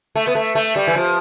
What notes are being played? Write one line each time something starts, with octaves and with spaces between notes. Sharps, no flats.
A3
B3
A3
A3
G3
E3
F3